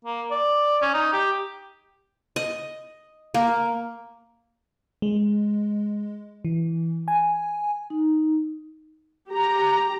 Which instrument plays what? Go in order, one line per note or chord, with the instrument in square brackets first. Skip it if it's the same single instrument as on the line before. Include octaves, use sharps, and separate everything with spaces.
[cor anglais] A#3
D5
C#4
D#4
G4
[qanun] D#5
A#3
[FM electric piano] G#3
E3
G#5
[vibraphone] D#4
[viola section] G4 A#5